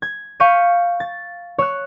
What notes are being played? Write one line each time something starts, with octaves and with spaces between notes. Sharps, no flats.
G#6
F5 C#6 G6 B6 D#7
A6
C#5 E6 F#6